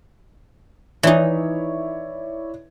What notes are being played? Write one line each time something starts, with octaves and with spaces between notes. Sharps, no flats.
E3 D#4 E4 C#5 D5